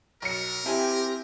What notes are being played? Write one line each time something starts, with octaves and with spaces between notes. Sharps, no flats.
B1 A#4 C#7
C4 E4 G4 G5 G#5